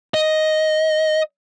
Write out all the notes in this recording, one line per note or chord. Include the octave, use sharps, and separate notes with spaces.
D#5